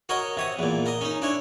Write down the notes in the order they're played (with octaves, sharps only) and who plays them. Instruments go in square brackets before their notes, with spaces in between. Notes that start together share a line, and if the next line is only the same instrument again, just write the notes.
[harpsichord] F#4 A#4 C#5 D#5
C3 C#5 D#6
E2 A#2
A#4 D#5
C#4 D#4
D4 E4 C#5